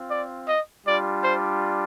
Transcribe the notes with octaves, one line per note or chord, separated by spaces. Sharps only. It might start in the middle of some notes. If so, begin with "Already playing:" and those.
Already playing: C4 F4
D5
D#5
G3 D4 F4 D5
C5